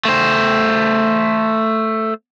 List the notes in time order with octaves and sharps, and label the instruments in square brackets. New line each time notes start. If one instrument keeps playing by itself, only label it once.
[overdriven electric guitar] A3 C5